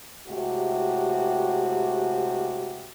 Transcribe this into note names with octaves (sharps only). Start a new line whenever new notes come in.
A2 C3 G#3 F#4 G4